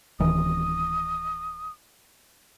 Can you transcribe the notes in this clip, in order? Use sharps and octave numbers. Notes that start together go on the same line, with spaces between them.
D1 D#3 E3 D#6